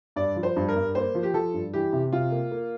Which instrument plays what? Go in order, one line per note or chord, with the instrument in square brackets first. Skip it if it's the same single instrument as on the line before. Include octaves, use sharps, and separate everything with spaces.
[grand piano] G2 [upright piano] D5
[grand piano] F3
[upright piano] C5
[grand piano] G2
[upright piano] A#4
[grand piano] G2
[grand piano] A#3 [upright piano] C5
[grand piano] F3
[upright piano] G4
[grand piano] F3 [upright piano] A4
[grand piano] G2
[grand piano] E3 [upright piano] G4
[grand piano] C3
[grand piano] C3 [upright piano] F4
[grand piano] A#3
A#3